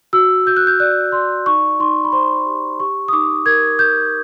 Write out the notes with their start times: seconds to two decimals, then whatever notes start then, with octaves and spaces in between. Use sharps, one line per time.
0.13 F#4 E6
0.46 F#4 G6
0.57 F#6
0.67 G6
0.80 D5 F#6
1.12 D5 C6
1.46 D#4 C#6
1.80 D#4 C6
2.04 B5
2.12 C5 C6
2.46 G4
2.80 G4 C#6
3.08 D#6
3.13 D#4 D6
3.46 A#4 G#6
3.79 A#4 G6